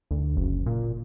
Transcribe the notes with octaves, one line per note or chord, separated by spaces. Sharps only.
D2
F#1
A#2